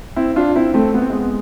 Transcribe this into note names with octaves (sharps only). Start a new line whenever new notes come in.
C4 E4
D4 F4
C4 E4
A3 C4
B3
C4
G#3 B3